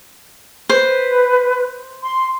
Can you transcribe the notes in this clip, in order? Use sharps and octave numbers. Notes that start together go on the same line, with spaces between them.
B4 C5
C6